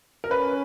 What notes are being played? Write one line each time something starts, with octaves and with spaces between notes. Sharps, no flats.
A#4
C#4 B4